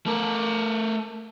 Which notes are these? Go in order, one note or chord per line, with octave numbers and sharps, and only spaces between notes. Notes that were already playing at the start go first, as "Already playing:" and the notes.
A3 A#4